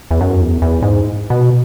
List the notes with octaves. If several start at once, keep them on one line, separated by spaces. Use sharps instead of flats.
E2
F#2
E2
E2
G#2
B2